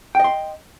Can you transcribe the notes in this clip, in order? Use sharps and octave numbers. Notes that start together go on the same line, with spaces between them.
D#5 G5 C6